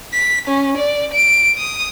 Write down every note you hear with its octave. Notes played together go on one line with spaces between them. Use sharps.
B6
C#4
D5
D7
D#6